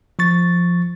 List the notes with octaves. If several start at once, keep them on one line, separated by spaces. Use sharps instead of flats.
F3 C#6 A6